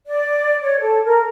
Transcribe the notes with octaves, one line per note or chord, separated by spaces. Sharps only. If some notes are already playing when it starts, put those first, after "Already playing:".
D5
C#5
A4
A#4